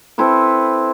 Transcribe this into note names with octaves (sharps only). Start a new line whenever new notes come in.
C4 E4 A4 B4